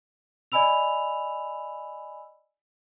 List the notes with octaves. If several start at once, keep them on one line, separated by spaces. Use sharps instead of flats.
D5 D#5 G#5 B5 E6 F7